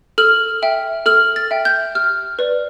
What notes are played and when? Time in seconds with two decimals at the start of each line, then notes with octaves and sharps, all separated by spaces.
0.18 A4 F6
0.62 E5 G5
1.06 A4 F6
1.36 A6
1.51 E5 G5
1.65 G6
1.95 G4 F6
2.39 B4 D5